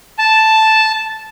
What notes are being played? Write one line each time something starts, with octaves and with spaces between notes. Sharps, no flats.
A5